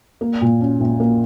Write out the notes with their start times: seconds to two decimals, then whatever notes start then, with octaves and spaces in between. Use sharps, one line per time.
0.21 A#3
0.41 A#2
0.61 C#4
0.80 A#1
1.00 A#3